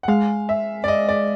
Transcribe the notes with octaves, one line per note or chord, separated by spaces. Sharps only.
F#5
G#3 F5
E5
D5
D#5
D5